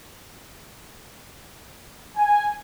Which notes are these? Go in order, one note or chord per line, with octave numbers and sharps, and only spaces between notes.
G#5